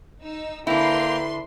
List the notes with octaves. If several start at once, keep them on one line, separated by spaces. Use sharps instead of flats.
D#4 E6
D3 A#3 E4 B4 G5 A#5 C6